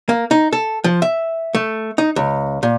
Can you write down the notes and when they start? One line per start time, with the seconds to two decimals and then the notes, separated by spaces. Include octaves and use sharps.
0.09 A#3
0.31 D#4
0.53 A4
0.84 F3
1.02 E5
1.55 A3
1.98 D#4
2.16 C#2
2.63 A#2